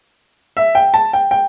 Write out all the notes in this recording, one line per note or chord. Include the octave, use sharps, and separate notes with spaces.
E5
G5
A5
G5
G5